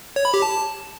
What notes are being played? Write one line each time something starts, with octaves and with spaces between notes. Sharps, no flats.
C#5
B5
G4
A5